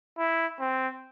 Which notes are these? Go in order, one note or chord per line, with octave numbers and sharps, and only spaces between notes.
E4
C4